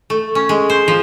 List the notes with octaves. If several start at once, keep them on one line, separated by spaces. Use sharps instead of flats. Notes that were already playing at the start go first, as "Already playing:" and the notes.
A3
C#4
G#3
C5
F3